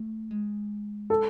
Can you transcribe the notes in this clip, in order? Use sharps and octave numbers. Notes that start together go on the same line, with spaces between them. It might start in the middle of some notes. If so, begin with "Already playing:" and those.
Already playing: A3
G#3
A4